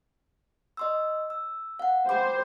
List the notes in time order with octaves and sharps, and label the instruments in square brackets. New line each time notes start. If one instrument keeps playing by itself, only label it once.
[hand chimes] D#5 C6 E6
E6
F5 F#5
[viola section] C5 [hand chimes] G5 B5 D6